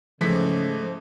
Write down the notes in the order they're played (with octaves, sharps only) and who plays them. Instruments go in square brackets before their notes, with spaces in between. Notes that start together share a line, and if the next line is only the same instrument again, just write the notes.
[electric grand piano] G#2 E3 B6 [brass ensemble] C#3 [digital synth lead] F3 [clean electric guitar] A3